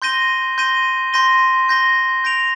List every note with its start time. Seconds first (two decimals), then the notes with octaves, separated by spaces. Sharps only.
0.02 C6 G6 A#6 D#7 G7
0.58 C6 G6 A#6 D#7 G7
1.13 C6 G6 A#6 D#7 G7
1.69 C6 G6 A#6 D#7 G7
2.24 G6 A#6 D7 F7